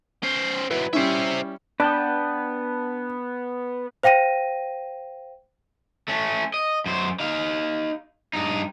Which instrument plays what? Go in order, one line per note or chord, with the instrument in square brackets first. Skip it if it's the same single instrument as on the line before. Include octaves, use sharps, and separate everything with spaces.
[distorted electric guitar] C#4 C5
[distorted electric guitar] F#3 E4 [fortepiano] B4
[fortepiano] G3 C#4 E4 [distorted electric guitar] C5 E5
[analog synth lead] B3 [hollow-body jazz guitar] D4 [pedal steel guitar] B4 G5 [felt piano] A5
[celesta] C5 F5 G5 A#6 D#7
[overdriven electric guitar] A3 C#4
D#5
F#2 C5
D#4 F5
G2 D#4